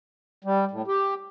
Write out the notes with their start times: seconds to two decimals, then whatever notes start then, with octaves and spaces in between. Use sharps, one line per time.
0.44 G3
0.71 A2
0.87 G4